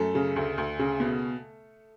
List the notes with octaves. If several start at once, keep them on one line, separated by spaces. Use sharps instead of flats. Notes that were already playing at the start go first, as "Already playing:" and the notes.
Already playing: F#2 A3 A4
C#3
D2
D2
C#3
B2